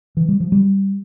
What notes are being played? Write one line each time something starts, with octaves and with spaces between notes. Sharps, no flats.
E3
G3
F3
G3